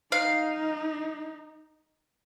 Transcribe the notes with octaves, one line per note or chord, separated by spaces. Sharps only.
D#4 F5